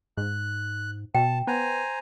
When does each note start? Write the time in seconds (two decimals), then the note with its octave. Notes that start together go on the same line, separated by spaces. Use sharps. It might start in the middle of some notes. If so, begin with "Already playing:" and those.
0.17 G#2 F#6
1.15 B2 G5 A5
1.47 B3 C5 G#5 A#5